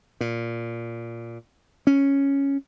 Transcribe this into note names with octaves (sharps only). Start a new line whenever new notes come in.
A#2
C#4